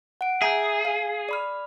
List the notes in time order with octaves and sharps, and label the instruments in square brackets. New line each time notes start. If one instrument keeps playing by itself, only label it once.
[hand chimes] F#5 D7
[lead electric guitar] G#4 [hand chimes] E5 A#5 G6
[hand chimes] F5
D5 B5 F6